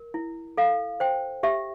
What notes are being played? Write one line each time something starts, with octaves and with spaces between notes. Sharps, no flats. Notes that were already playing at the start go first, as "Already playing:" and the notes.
Already playing: A#4
E4
A4 F5
C5 G5
G4 E5